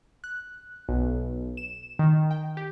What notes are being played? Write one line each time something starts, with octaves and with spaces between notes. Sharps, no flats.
F#6
B1
E7
D#3
G5
G4